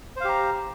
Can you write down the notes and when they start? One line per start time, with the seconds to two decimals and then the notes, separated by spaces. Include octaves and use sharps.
0.16 C5
0.20 F5
0.25 G4
0.29 A#5